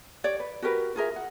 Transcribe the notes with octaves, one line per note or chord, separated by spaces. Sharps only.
G4 C#5 D5
B4
F#4 G4 A#4 B4
F4 G#4 A#4 E5
F#5